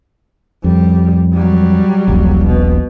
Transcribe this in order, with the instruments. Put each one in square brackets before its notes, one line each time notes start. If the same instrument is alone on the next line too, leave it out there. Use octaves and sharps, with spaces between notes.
[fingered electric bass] F2 [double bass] G3
[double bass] F#3 G3
[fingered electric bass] D#1 A#1
[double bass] B2